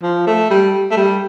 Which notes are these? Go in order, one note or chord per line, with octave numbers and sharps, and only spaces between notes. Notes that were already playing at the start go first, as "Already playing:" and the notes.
F3
A3
G3
A3
G3